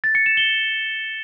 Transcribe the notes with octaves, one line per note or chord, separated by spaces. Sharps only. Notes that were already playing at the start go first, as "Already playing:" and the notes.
A6
C#7
E7
G7